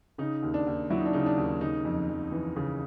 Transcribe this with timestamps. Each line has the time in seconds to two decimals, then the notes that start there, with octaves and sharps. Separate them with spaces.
0.18 C#3 D#4
0.43 D#2
0.54 D4
0.67 D#2
0.90 F#3 E4
0.98 D#4
1.06 D4
1.13 C#3 D#4
1.26 D4
1.37 D#2
1.61 C#3 D#4
1.85 F2
2.09 F2
2.32 E3
2.56 C#3